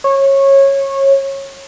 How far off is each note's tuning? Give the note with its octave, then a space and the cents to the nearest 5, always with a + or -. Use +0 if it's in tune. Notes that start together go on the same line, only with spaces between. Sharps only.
C#5 -20